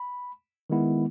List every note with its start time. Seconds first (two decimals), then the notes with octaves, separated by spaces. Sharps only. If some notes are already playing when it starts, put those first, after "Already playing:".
Already playing: B5
0.70 D#3 G#3 B3 E4